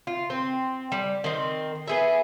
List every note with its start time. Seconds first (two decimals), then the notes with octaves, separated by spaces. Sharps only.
0.07 F4
0.30 C4
0.92 G3
1.24 D#3 C4
1.87 B3 G#4 E5